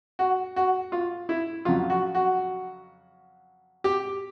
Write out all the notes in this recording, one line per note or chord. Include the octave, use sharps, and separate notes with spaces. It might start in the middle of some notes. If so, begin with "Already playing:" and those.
F#4
F#4
F4
E4
F2 C#3 F#3 F4
F#4
F#4
G4